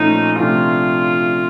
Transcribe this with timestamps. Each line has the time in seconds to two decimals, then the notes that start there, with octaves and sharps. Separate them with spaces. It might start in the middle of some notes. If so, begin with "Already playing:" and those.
Already playing: A#2 F3 A3 C#4 D#4
0.39 C3 F3 A3 D4 F4